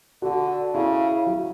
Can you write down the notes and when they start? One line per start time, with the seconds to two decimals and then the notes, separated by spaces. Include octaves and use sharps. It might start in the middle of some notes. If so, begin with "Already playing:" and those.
0.22 D3 F#4
0.74 C#3 E4
1.26 F#3